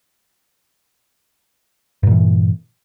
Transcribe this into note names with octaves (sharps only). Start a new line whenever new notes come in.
G2 A#2 E3